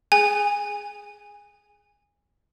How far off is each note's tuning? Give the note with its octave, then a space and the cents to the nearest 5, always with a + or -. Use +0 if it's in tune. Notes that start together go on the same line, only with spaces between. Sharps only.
G#4 +0 G#5 -20